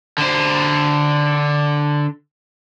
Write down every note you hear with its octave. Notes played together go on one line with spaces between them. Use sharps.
D3 C5